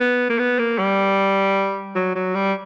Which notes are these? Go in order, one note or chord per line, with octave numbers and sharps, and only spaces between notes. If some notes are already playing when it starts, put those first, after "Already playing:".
B3
A#3
B3
A#3
G3
F#3
F#3
G3